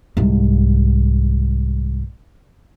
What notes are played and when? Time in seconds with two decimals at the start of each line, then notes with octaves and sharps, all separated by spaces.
0.17 C2 G#2